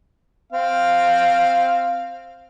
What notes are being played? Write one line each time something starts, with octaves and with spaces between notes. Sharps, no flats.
C4 F5